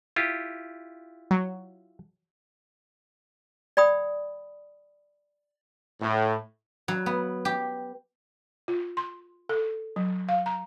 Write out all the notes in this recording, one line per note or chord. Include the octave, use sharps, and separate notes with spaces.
E4 F4 G4
F#3
D5 G5 B5 D#6
A2
F#3
B3
G4
F4
C6
A4
F#3
F5
A#5